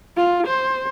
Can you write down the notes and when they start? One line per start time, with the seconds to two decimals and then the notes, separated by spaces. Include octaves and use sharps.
0.16 F4
0.47 C5